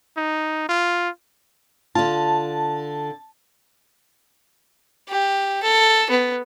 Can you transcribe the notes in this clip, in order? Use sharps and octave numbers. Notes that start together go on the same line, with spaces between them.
D#4
F4
D3 F4 A5
G4
A4
B3